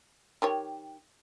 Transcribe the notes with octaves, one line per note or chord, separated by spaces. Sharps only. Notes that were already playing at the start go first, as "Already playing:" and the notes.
D#3 G4 C#5